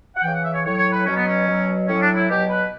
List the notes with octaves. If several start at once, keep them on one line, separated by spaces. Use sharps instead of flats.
F#5
C#3 E3 G5
F#5
E5
C#5
A2 F#3 C#5
C#5
B4
B2 F#3 C#4
B3
C#4
B2 F#3
A2 F#3 C#4
D4
E4
B2 F#3 G4
B4